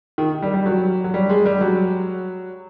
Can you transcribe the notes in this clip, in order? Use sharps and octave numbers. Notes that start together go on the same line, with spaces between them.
D#3
G3
G3
F#3
F#3
G3
G#3
G3
F#3